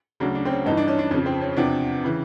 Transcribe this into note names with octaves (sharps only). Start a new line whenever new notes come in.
D2 C#3 F#3 D4
D4
C4
C#4
G2 E3 D#4
D4
C#4
D4
F2 C#3 F3 C#4
C4
C#4
C#4
E2 C3 F3 D4
C#3 E3